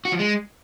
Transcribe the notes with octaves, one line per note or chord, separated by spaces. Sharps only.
F#4
F3
G#3